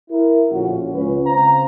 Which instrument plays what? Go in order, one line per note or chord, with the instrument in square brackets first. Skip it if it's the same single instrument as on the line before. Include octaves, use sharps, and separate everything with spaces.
[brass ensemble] E4 A#4
A#1 A2 D3 C#4 F4 F#4
C#2 C#4 B4
C#3 C4 C5 F5 A#5